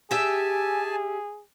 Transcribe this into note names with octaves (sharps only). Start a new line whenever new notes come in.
G4 G#4 E5 G#5 A5